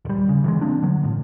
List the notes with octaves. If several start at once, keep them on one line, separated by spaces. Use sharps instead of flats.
D#1 G3
C#3
E3 G3 G#3
A#3 C4 D4
D3 F#3
A1 A2